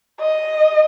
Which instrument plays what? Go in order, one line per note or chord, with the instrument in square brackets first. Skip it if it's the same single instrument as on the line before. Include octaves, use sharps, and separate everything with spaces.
[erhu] D#5